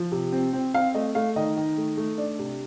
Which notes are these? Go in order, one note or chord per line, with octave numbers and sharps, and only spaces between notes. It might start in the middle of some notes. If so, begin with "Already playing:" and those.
Already playing: F3
C3
C4
C4
C4 F5
A3 D#5
A3 F5
D#3 D#5
D#3
A3
A3
D4
C3